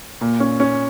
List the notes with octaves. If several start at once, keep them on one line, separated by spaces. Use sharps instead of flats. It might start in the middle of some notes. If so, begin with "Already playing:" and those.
A#2
C#4
C#4